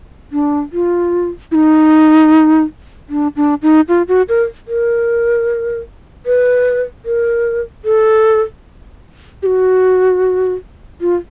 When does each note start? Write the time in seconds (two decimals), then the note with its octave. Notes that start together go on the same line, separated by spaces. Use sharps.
0.32 D4
0.73 F4
1.52 E4
1.55 D#4
3.09 D4
3.36 D4
3.62 D#4
3.89 F4
4.08 F#4
4.29 A#4
4.68 A#4
6.26 B4
7.05 A#4
7.85 A4
9.43 G4
9.46 F#4
11.01 F4